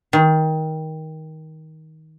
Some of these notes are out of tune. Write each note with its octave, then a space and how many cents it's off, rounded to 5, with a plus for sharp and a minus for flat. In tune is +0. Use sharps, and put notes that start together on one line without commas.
D#3 +20